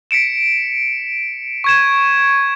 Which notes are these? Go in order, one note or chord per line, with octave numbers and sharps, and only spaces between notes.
B6 C#7 D7 E7
C#6 G#6 E7